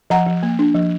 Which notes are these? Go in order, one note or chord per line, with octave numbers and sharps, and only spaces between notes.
F3 F#5 A#5
F3
A#3
D4
F3